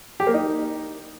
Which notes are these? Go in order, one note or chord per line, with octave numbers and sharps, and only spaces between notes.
G4
A#3
D#4